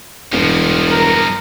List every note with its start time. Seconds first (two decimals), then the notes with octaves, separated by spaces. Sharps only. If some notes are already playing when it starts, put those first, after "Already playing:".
0.32 E1 G2 F3
0.91 A#4